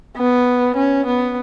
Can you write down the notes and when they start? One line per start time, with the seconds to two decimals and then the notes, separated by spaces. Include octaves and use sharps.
0.17 B3
0.76 C#4
1.06 B3